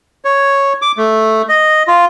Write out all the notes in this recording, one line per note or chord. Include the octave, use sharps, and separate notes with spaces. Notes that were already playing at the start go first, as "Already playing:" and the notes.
C#5
D6
A3
D#5
F4